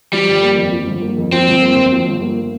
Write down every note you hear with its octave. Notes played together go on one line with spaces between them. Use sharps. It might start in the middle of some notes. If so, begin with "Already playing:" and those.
F3 G3
G1
A#3
F2
F3
G1
A#3
F2
F3 C4
G1
A#3
F2
F3
G1
A#3